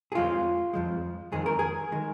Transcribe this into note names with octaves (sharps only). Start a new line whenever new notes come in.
G#4
F2 F3 G#3 F4
F2 F3 G#3
F2 D#3 G#3 G#4
A#4
G#4
D#3 G#3